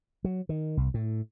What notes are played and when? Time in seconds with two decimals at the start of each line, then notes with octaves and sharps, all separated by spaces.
0.24 F#3
0.49 D#3
0.77 C2
0.94 A2